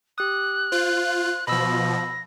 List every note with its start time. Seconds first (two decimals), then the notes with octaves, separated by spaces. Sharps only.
0.18 G4 D#6 F#6
0.72 F4 C5
1.47 B2 F3 B5 E6 A#6